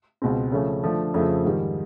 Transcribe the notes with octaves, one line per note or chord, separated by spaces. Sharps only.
C#2 B2 G#3 C4
C#3 F3 A3 C#4
D3 F3 A3 D4
F2 C#3 F3 A3
G#2 D#3 G3